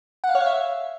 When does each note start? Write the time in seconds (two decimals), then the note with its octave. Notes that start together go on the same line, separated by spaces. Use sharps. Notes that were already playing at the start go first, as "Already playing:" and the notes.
0.24 F#5
0.29 F5
0.35 C#5
0.40 F5
0.46 E5